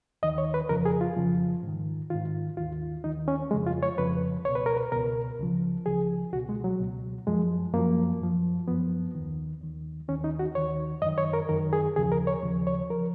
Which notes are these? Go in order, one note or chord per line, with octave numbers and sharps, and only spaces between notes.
D#2 D#3 D#5
C#5
B4
F2 C#3 F3 A#4
G#4
F4
F2 C#3 F3
G#2 D#3
G#2 D#3 F4
D#2 D#3 F4
D#2 D#3 D#4
C#4
F2 C#3 F3 G#3
F4
C#5
F2 C#3 F3 B4
C#2 B2 C#5
B4
A#4
B4
C#2 B2 A#4
C#2 C#3 F3
C#2 C#3 F3 G#4
C#2 B2 F#4
G#3
F#3
C#2 B2
F#2 F3 G#3
F#2 F3 A#3
F#2 F3
F#2 F3 B3
D#2 D#3
D#2 D#3
D#2 D#3 C#4
D#4
F#4
D#2 D#3 C#5
F#2 D#3 D#5
C#5
A#4
F#2 D#3 A#4
G#4
D#2 C#3 F3 G#4
A#4
C#5
D#2 C#3 F3
C#5
F3 A#4